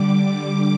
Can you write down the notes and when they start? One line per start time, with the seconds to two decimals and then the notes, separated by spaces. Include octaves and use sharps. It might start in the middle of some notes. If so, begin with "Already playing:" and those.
Already playing: D3 G3 D6
0.24 D6